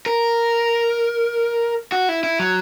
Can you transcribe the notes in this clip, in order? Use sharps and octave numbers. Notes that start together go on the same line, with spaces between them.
A#4
F#4
E4
E4
F#3